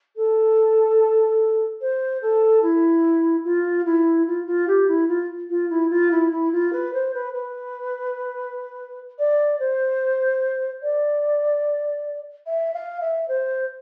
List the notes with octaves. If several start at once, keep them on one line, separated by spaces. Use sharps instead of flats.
A4
C5
A4
E4
F4
E4
F4
F4
G4
E4
F4
F4
E4
F4
E4
E4
F4
B4
C5
B4
B4
D5
C5
D5
E5
F5
E5
C5